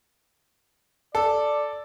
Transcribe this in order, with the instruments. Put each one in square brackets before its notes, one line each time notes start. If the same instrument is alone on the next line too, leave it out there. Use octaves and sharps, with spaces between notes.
[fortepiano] A4 [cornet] D5